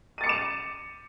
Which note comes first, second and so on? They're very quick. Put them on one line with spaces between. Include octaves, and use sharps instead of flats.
D#7 A6 C#7 D6 E7